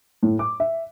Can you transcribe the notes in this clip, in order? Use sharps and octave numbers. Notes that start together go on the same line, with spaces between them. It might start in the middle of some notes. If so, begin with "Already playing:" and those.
A2
D6
E5